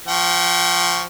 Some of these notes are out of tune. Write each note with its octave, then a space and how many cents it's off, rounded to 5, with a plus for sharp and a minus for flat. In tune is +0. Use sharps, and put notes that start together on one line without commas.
F3 +0 G5 -40 C#6 +0